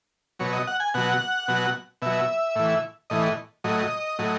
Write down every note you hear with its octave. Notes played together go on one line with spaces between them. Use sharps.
B2 F#3 C#5
D#5
F#5
G#5
B2 F#3 F#5
B2 F#3
B2 F#3 E5
A2 E3
A2 E3 D#5
A2 F#3 D#5
A2 F#3